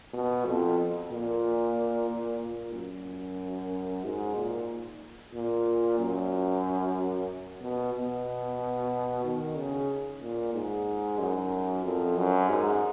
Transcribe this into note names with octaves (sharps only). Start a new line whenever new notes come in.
B2
F2
A#2
A#2
A#2
F#2
G#2
A#2
A#2
F#2
B2
B2
D#3
C#3
A#2
G#2
F#2
F2
F#2
G#2